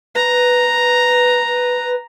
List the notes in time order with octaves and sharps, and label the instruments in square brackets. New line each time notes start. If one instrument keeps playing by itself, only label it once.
[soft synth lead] B4 [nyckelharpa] A#5